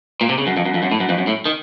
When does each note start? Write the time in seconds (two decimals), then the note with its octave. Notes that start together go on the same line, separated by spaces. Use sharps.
0.21 A#2
0.29 C3
0.38 C#3
0.47 F#2
0.57 F2
0.65 F#2
0.74 F2
0.83 F#2
0.92 A2
1.00 F#2
1.09 F2
1.18 F#2
1.27 A2
1.46 D#3